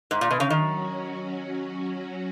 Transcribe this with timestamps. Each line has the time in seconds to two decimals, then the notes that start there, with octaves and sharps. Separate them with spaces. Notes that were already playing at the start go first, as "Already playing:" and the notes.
0.11 G#2
0.21 A#2
0.31 B2
0.40 C#3
0.50 D#3 F#3 C#4 F#4